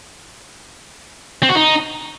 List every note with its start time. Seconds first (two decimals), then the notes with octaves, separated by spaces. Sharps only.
1.43 C4
1.49 F#4
1.55 D#4